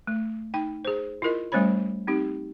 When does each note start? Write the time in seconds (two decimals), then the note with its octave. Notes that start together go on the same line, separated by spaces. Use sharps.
0.07 A3
0.54 D#4 G5
0.85 G#4 C5
1.22 E4 F4 A#4 D#5
1.52 G3 A3 C#4 C5 C#5 B5
2.07 C4 D#4 G4